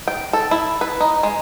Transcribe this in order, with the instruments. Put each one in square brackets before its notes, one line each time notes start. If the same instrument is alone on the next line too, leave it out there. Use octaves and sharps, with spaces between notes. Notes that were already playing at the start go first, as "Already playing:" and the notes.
[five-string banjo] G5
A4
E4
B4
D#4
G#3